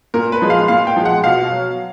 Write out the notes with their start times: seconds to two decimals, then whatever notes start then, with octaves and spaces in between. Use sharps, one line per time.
0.14 A#2 A#4
0.32 B4
0.42 F3 G#3
0.50 F5
0.68 A#2 F5
0.87 G5
0.96 F3 G#3
1.05 F#5
1.24 B2 F5
1.51 F#3